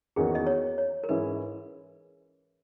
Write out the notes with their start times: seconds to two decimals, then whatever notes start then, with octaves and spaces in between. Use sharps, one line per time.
0.16 E2 D#3 A#3 C#4 F#4 G#4
0.35 D#5
0.47 C#5
0.78 C#5
1.04 A#4
1.09 G#2 E3 G#3 C#4 E4 B4